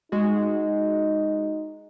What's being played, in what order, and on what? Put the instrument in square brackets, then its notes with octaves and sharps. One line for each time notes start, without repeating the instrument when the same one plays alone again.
[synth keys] G#3 F#4 [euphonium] D#4